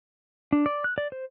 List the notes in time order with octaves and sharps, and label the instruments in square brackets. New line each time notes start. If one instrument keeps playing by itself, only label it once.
[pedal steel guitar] D4
D5
F#6
D5
C5